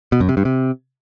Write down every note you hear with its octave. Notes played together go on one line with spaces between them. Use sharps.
B2
F#2
C3
G2
C3